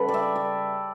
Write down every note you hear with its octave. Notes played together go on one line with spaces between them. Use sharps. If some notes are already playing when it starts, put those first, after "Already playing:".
Already playing: C#3 G3 A4 B4
D5
E5
D5